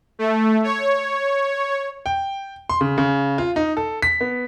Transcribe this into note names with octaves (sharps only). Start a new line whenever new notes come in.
A3
C#5
G5
C6
C#3
C#3
F4
D#4
A4
B6
B3